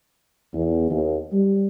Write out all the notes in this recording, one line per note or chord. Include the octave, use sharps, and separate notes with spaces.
E2
D#2
G3